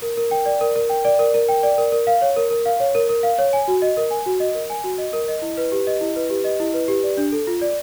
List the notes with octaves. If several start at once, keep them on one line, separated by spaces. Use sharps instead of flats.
A#4
A#4
G5
D5
A#4
A#4
G5
D5
A#4
A#4
G5
D5
A#4
A#4
F5
C#5
A#4
A#4
F5
C#5
A#4
A#4
F5
C#5
G#5
F#4
D#5
A#4
G#5
F#4
D#5
A#4
G#5
F#4
D#5
A#4
D#5
E4
B4
G4
D#5
E4
B4
G4
D#5
E4
B4
G4
D5
D4
A4
F4
D5